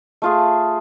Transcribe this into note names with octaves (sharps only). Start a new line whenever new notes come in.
A3 F4 G#4